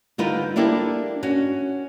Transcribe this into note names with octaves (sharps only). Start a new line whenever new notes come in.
D3 G3 D#4 F4 A#4 B4
A#3 D4 E4 G4 A4 A#4
C#4 F#4